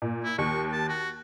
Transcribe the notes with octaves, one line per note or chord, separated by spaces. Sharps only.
A#2
E4
D#2 C#6
A5
F#4